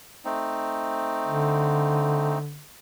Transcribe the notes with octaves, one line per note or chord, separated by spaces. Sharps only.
A3 C4 D#4
D3